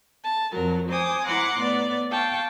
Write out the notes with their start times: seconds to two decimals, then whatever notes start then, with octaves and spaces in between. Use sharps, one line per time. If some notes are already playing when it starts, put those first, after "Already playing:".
0.23 A5
0.53 F2 F#3 A#4
0.88 C5 G#5 D6 D#6
1.26 E4 F#5 A#5 C6 D6
1.58 A2 B3 D5
2.11 F5 G5 A5 C#6